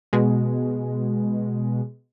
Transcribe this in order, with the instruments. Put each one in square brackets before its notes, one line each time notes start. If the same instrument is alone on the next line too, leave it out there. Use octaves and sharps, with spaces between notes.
[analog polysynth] B2 G#3